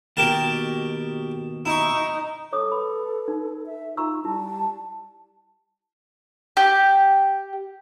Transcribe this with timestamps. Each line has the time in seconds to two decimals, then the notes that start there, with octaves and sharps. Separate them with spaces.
0.17 D#2 B2 G4 A#4 A5
1.66 D#4 E4 C#6
2.53 A4 C#5 D6 D#6
2.72 B4 B5
3.28 D#4
3.66 E5
3.97 D#4 F4 A#5 C#6 E6
4.25 G3 E4 A5
6.57 G4